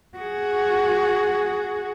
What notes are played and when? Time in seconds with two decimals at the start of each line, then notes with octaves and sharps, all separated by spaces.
0.18 F#4 G#4